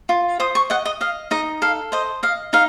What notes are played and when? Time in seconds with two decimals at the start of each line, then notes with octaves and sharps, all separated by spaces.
0.09 F4
0.40 C5 D#6
0.55 C#6
0.70 D#5 F#5
0.85 D#5
1.01 D#5 F5
1.31 D#4 D#5
1.62 A4 F5
1.92 C5 D#5
2.23 D#5 F5
2.53 D#4 F5